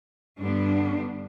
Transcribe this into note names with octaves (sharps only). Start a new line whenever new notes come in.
G2 D3 G3 B3 D4